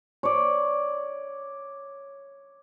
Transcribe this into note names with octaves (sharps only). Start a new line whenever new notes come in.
C#5 D5